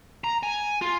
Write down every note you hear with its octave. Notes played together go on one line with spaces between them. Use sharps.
A#5
G#5
F4